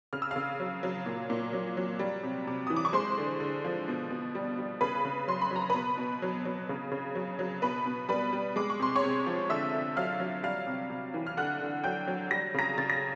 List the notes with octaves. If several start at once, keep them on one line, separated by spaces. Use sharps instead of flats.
C#3 F6
E6
C#3 F5 F6
F#3
F#3
A#2
A#2
F#3
F#3
G3
C3
C3
E3 D#6
D6
C#6
G#3 C5 C6
D3
D3
F3
B2
B2
G3
G3
C#3 B4 B5
C#3
F#3 C6
B5
F#3 A#5
B2 B4 B5
B2
F#3
F#3
C#3
C#3
F#3
F#3
B2 B4 B5
B2
G3 B4 B5
G3
G#3 D6
C#6
C3 C6
C#5 C#6
C3
F3
D3 E5 E6
D3
F#3 F5 F6
F#3
G3 F5 F6
C3
C3
E3
F6
D3 F#5 F#6
D3
F#3 G5 G6
F#3
G3 A#6
C#3 A#5 A#6
C#3 A6
A#6